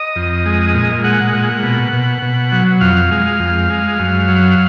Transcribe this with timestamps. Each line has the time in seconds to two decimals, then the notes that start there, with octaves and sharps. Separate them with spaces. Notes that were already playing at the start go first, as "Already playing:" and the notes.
Already playing: D#5
0.16 F2
0.45 G#3
0.74 A#2
1.04 G#3 F#5
1.33 A#2
1.63 B2
1.93 B2
2.22 B2
2.52 F#3
2.81 F2 F5
3.11 G#3
3.40 F2
3.70 G#3
3.99 F#2
4.28 F#3